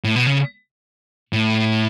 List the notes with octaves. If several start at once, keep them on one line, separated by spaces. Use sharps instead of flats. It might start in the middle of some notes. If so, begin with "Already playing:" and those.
A2
B2
C#3
A2